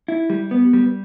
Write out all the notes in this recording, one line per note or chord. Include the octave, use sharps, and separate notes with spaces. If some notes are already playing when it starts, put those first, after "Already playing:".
E4
G3
B3
G3